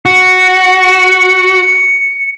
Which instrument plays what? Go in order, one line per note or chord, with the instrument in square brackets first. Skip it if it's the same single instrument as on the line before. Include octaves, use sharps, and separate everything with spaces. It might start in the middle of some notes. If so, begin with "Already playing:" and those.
[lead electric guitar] F#4 [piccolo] C#7